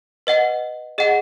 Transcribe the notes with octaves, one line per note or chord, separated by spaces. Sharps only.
B4 D#5 F#5
G#4 D#5 F#5